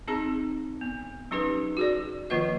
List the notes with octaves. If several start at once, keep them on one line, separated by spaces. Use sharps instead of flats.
C4 D#4 G#4 A#5
B3
F#3 C#4 D#4 G4 B4
F#4 G#4 D5
D#3 F3 A#3 F4 B4 D#5